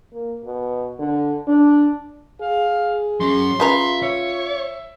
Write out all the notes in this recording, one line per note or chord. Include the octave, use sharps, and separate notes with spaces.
A#3
B2
D3
D4
G#4 F5
F#3 C#4 C6
C#3 F4 B4 E5 A#5
C#5 E5